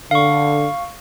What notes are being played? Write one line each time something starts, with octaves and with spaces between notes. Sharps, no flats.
D3 F5 C#6